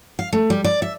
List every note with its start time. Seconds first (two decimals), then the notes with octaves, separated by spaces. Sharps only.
0.19 F5
0.33 A3
0.50 G3
0.64 D5
0.82 E5